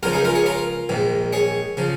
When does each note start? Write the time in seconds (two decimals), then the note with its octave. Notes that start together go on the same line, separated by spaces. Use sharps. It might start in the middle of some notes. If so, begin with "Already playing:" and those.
0.03 C#2 C#3 F3 F4 A#4
0.13 D#4 G#4
0.24 F4 A#4
0.35 G#4 C#5
0.46 F4 A#4
0.89 A#1 G#2 D#3
1.33 G#4 C#5
1.77 C#3 F3